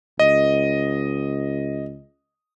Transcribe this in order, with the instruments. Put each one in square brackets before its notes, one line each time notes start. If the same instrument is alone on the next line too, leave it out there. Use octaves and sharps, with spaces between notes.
[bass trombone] C#2 [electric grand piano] D#5